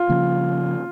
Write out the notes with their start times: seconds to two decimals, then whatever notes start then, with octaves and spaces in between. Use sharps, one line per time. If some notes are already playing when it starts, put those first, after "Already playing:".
Already playing: F4
0.09 C#3 F3 A#3 C#4